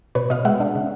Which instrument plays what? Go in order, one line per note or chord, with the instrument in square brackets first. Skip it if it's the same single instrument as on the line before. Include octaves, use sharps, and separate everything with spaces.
[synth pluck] B2 B4 C#5
B2 D#5 F5
G#3 E5 F#5
D4
C#3